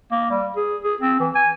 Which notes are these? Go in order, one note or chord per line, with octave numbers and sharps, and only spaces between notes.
A#3
G3
G#4
G#4
C4
E3
G#5